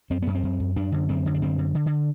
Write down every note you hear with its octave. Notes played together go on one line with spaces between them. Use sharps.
F#2 C4
F#2 B3
C4
F#2
F#2
F#2 D4
D3
F#2 C4
D3
D4
F#2 C4
D3
D3
D3